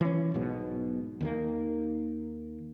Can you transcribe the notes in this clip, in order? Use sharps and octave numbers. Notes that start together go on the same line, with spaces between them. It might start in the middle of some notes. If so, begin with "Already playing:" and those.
E3 C#4
B1 G#2 B2
D#2 D#3 A#3